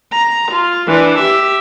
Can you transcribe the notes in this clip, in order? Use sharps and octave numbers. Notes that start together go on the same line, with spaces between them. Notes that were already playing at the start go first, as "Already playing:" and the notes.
A#5
F4
E3 D4
G4 E5